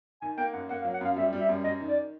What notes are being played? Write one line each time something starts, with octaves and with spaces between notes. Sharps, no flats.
D#3 G#5
A#3 G5
F#2 F#5
A#3 F#5
F5
F#3
F#5
F#2 F5
G3 E5
G3
E5
F#2
F#2 D#5
D#3
D5